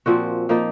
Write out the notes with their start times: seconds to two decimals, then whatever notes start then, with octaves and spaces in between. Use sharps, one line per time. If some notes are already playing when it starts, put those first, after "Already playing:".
0.06 A#2 F3 C4 F#4
0.49 F3 A#3 D#4